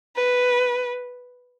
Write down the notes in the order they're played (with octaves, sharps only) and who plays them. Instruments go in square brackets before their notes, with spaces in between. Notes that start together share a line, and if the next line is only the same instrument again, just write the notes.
[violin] B4